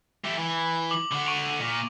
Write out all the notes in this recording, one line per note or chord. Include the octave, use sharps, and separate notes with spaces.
A3 G4
E3
D6 F#7
D3 F#4
C#6 D7 F7
A#2